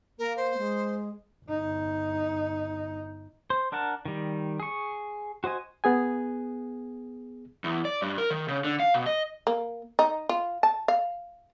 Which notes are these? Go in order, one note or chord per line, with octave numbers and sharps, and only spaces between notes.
A#3 A#4
C5
G#3
G1 D#4
C5
D4 A#4 F#5 A5
D#3 G3
G#4 C#6
F#4 C5 D#5 G#5
B3 G#4 G#5
E2
D5
G2
A#4
D#3
C#3
D3
F5
B2
D#5
A#3
D#4
F4
A5
F5